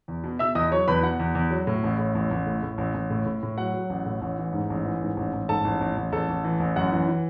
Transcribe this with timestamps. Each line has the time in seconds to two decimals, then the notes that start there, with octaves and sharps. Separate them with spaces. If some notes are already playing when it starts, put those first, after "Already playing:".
0.08 E2
0.24 B2
0.39 B2 E5 E6
0.55 E2 D#5 D#6
0.72 F#3 C#5 C#6
0.88 E2 B4 B5
1.03 B2 F#5
1.20 E2
1.35 E2
1.51 F#3
1.67 A2
1.84 A1
1.99 A2
2.15 A1
2.31 A1
2.47 A2
2.63 A2
2.78 A1
2.94 A1
3.10 A2
3.26 A2
3.43 A2
3.58 F#3 F#5
3.74 F#3
3.90 A1
4.06 A2
4.21 A1
4.38 E3
4.53 G#2
4.70 A1
4.85 E3
5.02 G#2
5.17 A1
5.33 A1
5.49 G#2 A4 A5
5.65 A1
5.81 A1
5.97 A1
6.12 A1 A4 A5
6.28 A1
6.44 E3
6.60 A1
6.76 F#2 F#5
6.92 E3
7.08 E3